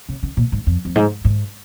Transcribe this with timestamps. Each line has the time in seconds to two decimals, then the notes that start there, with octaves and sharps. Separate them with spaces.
0.09 C#3
0.23 C#3
0.37 A#2
0.52 G#2
0.67 F2
0.85 F2
0.96 G#2
1.25 G#2